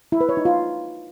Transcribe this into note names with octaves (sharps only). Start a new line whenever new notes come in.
E4
B4
C#5
D#4
F4